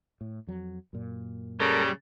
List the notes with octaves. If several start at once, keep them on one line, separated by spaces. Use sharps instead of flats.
A2
F2 F#3
F#2 A#2
C#3 G3 A4 A#4